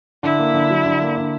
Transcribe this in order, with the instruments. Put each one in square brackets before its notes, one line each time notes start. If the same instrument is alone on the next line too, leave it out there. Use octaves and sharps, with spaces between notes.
[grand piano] D3 [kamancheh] E4
[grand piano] A#3
D3
F#3
D3
A#3
D3